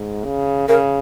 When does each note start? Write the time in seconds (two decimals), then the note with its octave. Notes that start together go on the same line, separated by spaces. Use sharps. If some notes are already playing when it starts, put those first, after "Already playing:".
Already playing: G#2
0.25 C#3
0.69 C#3 A#4